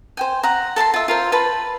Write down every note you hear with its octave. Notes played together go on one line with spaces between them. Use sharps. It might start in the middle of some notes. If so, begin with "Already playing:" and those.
C5 G5 G#5
F#5 A#5
A4 A5 A#5 C6
F4 E5
F4 A#4 C5
B4 A5 B5